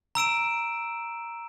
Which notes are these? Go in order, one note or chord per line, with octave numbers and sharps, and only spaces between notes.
A#5 E6 D7 E7